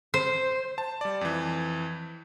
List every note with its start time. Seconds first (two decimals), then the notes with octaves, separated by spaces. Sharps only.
0.14 C5
0.78 A5
1.01 G3 D5
1.21 F2 E3